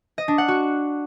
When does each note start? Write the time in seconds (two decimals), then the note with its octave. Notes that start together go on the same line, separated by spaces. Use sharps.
0.18 D#5
0.28 D4
0.38 F#5
0.48 F#4